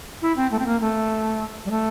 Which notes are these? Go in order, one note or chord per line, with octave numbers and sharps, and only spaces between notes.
E4
C4
A3
C4
A#3
A3
G3
A3